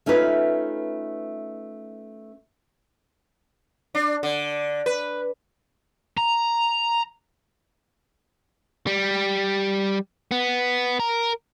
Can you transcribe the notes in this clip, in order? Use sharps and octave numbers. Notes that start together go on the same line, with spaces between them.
A3 C#4 D#4 F4 B4
D4
D3
B4
A#5
G3
B3
A#4